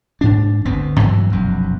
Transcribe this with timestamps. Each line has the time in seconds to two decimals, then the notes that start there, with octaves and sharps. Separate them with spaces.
0.21 G#2 D4
0.65 G1 D2 B3 C4
1.00 G2 E3 F#3
1.31 F1 B1 F#2